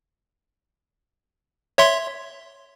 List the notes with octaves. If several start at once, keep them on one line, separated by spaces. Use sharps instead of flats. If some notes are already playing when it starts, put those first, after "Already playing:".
C#5 E5 C6